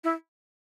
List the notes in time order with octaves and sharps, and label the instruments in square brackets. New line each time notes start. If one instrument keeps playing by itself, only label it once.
[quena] E4